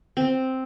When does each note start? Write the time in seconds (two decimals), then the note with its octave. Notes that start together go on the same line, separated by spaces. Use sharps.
0.17 C4